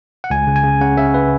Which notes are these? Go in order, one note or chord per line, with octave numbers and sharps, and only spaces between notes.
F#5
C#2 G#5
C#3
G#5
C#3
C#3 F#5
C#3 E5
C#3 B4